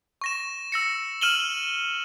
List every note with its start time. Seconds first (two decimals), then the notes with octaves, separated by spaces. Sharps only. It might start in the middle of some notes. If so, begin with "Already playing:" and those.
0.21 C#6 A#6 E7
0.72 E6 A#6 C#7
1.21 F6 D#7 E7 F#7 G7